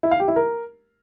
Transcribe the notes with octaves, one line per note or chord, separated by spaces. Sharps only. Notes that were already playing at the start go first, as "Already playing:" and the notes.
E4
F5
G4
E4
A#4